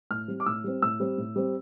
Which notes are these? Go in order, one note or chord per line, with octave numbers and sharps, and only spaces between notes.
A2 F6
G3 C4
D6
A2 E6
G3 C4
A2 E6
G3 C4
A2
G3 C4